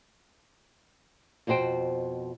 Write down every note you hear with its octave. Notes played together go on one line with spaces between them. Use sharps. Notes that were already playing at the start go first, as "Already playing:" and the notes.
F2 B2 F#4 C5 G5